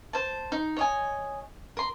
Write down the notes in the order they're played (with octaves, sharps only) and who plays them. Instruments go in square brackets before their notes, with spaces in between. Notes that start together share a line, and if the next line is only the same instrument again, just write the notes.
[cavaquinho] C5 A5
D#4
C#5 D#5 G#5
A#4 C6